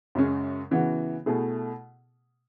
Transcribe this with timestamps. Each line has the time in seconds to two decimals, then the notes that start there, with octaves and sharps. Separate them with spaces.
0.15 F#2 C#3 G#3 C#4 G#4
0.71 C#3 E3 B3 F#4
1.26 B2 A3 E4 G#4